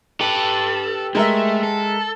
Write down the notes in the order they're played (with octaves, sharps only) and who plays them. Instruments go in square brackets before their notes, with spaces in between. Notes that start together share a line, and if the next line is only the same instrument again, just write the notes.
[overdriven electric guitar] G4 B4 [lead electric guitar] A4
[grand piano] G#3 A#4 E5 [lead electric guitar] A3
[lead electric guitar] A4